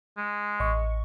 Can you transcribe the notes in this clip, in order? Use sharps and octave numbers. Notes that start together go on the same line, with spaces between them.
G#3
A1 D#5 C#6